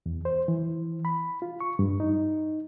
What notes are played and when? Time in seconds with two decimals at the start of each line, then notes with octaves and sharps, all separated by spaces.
0.06 E2
0.25 C5
0.48 E3
1.05 B5
1.42 F4
1.61 C#6
1.79 G2
2.00 D#4